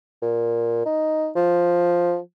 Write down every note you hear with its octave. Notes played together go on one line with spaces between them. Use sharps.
A#2
D#4
F3